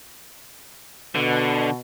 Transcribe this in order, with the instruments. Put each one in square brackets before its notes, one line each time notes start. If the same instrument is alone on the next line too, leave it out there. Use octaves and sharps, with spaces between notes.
[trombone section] B2 [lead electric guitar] D3